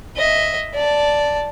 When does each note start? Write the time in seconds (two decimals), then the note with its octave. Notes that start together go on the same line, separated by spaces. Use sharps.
0.17 D#5 E5
0.75 D5 A5